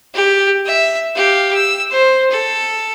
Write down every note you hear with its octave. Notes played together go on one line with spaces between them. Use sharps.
G4
E5
G4 F5
E6
C5
A4